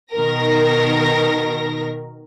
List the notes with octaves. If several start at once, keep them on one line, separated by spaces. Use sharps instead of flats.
B2 D#3 A#4 A#6